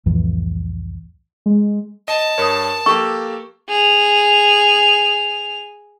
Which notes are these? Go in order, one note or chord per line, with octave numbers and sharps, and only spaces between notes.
C2 F2 A2 E3
G#3
D#5 A5
G2 A#4 C#5 D#6
A#3 G4 A4 C#6
G#4 F7